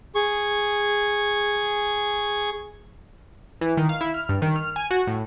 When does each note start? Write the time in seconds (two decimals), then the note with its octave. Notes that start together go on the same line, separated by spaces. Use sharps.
0.15 G#4 C#6
3.61 E3
3.77 D#3
3.89 F5
4.01 E4
4.14 F6
4.29 G2
4.42 D#3
4.56 F6
4.76 G#5
4.91 F#4
5.07 A2